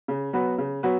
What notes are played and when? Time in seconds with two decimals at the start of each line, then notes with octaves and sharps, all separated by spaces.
0.08 C#3
0.33 F#3 B3 F#4 B4
0.58 C#3
0.83 F#3 B3 F#4 B4